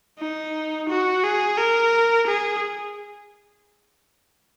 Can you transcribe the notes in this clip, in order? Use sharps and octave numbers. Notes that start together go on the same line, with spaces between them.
D#4
F#4
G#4
A#4
G#4